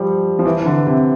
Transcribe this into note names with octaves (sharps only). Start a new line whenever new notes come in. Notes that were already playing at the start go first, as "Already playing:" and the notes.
Already playing: F3 G3
F3
E3
E3
D3
C3